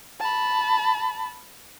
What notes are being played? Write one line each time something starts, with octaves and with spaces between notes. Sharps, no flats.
A5 B5